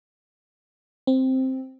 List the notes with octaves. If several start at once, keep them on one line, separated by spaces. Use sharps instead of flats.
C4